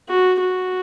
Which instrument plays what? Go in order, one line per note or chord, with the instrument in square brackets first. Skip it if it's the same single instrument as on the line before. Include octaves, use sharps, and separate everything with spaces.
[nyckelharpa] F#4
F#4